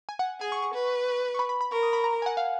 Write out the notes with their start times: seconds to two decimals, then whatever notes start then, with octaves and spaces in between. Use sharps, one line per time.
0.09 G#5
0.19 F#5
0.30 F#5
0.40 G#4 G#5
0.52 C#6
0.62 C#6
0.74 B4
1.34 C#6
1.39 B5
1.49 B5
1.61 B5
1.71 A#4 C#6
1.83 D#6
1.93 B5
2.04 A#5
2.22 G#5
2.26 F#5
2.37 F5